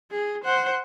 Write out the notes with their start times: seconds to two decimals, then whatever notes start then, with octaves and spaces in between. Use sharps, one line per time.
0.11 G#4
0.44 C5 F#5